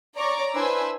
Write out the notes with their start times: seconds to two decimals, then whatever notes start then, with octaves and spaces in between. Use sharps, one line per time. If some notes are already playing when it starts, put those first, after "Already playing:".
0.17 C#5 D5 A#5 C#6 D6
0.55 D4 E4 B4 C5 G#5 E6